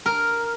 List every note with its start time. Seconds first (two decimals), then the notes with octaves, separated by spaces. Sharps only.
0.06 A#4